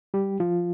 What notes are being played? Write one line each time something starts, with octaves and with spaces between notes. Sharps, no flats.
G3 G4
F3 F4